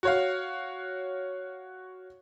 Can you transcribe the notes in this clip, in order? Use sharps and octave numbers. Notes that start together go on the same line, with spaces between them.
F#4 C#5 F5